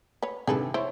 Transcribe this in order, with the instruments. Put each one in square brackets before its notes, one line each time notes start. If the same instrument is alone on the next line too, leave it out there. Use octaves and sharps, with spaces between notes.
[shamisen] B4 C#5
[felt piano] G2 C3 D#3 [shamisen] G#4 A4 B4
[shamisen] F3 E4 C5 [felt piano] C#5